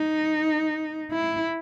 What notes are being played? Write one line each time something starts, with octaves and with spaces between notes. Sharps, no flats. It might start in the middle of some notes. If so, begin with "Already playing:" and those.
Already playing: D#4
E4